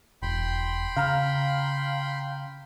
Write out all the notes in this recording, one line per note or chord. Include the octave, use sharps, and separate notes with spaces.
E1 G5 B5 C6
C#3 F5 A#5 F6